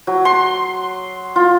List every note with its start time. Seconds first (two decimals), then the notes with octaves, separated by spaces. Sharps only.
0.07 F#3
0.25 C6
1.36 F4